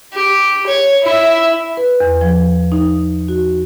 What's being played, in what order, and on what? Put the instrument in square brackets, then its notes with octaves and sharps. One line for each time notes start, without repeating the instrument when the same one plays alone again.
[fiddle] G4
C#5
E4 E5
[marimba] B4
E2
F3
D#4
F#4